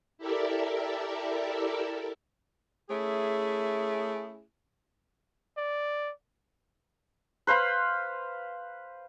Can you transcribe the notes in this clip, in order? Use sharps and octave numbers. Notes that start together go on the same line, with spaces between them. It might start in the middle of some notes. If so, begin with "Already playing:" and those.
E4 G4 A4 A#4 D5 E5
A3 C#4 E4 G#4
D5
B4 C5 F5 B5